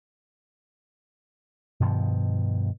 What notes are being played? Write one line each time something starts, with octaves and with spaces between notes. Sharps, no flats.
G2 B2 D#3 F3